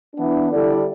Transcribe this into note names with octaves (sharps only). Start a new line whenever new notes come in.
E3 B3 D4
D3 G3 E4 A4 D5